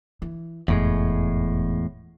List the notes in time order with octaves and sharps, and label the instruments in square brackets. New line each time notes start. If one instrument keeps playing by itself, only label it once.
[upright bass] E3
[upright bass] F1 [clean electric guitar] E2 A2 G#3